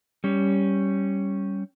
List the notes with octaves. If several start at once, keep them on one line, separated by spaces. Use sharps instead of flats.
G3 C#4